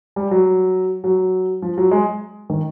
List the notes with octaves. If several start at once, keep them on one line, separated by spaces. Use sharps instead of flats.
G3
F#3
F#3
F3
F#3
G#3
D#3